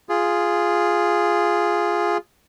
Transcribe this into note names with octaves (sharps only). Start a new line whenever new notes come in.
F4 G#4